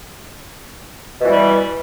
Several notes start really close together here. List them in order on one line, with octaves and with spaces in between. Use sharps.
B2 E3 G3